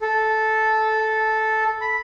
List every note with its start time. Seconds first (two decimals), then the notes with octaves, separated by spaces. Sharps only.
0.01 A4
1.81 B5